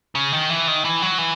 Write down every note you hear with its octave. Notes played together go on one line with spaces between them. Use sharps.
C#3
D#3
E3
D#3
E3
F#3
E3